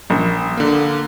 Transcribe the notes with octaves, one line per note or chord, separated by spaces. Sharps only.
A#1
D3 A#3